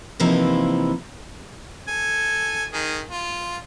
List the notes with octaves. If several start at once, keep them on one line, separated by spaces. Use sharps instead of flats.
C3 E3 F3 A#3 D#4 E4
A4 G#5
D#3 G#4
F4